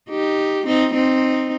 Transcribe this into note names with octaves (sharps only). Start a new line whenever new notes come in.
D#4 G4
C4 D#4
C4 D#4